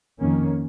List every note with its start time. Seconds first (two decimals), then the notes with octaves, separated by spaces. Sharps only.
0.19 F2 D#3 A#3 C#4